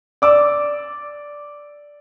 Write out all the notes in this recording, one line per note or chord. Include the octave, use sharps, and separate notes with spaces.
D5 D6 E6